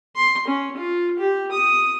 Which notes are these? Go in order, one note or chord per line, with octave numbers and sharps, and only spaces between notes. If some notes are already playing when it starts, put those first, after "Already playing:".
C6
C#4
F4
G4
D#6